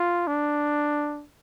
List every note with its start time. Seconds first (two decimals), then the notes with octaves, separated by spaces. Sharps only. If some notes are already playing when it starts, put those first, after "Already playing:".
Already playing: F4
0.27 D4